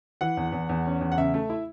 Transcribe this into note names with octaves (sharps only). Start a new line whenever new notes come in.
E3 F#5
E2
E2
E2
C#4
E2
F#5
C#3 E5
A3
E4